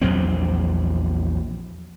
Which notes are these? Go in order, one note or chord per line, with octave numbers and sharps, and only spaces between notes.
A#1 E2 F#3 C4